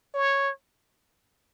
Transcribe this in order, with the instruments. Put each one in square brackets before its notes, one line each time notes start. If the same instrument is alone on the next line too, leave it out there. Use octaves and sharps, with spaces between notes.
[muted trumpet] C#5